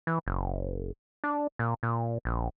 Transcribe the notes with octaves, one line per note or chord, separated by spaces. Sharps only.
E3
F#1
D4
A#2
A#2
A#1